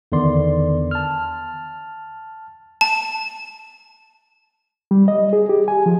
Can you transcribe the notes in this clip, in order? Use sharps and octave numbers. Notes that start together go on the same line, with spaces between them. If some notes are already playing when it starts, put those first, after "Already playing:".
E2 D3 D#3 B3 D5 C6
A5 F6
A5
G3
D#5
G#4
G4
G#5
F3